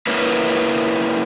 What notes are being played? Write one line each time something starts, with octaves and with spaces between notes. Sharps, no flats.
A#3 C#4 E4 B4